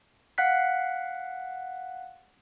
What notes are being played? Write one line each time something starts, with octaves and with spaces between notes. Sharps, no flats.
F5 F#5 F#6 B6